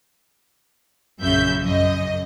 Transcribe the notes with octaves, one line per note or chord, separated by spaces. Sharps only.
A#1 F#2 C#3 E5 G6
F#2 D#5